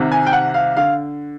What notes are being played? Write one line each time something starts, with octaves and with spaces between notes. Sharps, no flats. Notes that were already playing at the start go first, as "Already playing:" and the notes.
Already playing: C2 C3 D#3
G#5
G5
F#5
F5
D3 F5